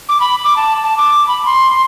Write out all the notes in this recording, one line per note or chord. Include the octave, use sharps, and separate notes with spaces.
D6
B5
D6
A5
A5
D6
B5
C6